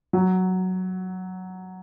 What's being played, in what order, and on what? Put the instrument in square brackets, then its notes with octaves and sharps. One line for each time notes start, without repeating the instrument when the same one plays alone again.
[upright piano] F#3